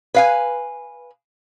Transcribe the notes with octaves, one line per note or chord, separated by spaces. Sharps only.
B4 F5 G#5